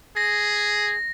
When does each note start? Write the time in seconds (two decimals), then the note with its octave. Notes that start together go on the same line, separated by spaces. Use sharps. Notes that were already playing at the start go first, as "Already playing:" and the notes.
0.17 G#4 A#6